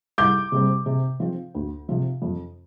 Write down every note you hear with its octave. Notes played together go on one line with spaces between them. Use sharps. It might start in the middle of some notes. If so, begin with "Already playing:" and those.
C2 D6 G6
C3 G3 C4
C3
F3 C4
D2
C3 F3
F2